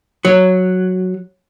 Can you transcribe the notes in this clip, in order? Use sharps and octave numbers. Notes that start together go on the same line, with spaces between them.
F#3